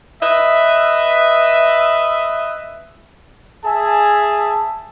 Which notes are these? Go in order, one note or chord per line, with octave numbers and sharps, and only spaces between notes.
B4 D#5 E5
G#4 E5 G#5 A5